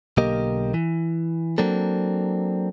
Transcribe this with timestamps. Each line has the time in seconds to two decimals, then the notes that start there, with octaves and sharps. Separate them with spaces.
0.17 B1 D3 A#3 G4 A#4 D#5
0.74 E3
1.58 F#3 A#3 C4 D4 A4